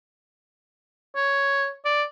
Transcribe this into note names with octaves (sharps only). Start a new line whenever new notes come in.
C#5
D5